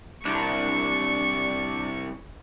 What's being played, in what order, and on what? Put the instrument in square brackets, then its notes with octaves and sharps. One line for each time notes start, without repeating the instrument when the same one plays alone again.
[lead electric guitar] C2 [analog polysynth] D4 [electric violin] C#6